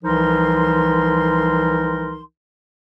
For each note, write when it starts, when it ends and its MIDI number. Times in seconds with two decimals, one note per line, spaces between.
0.04 2.20 36
0.04 2.20 52
0.04 2.20 53
0.04 2.20 63
0.04 2.20 70
0.04 2.20 84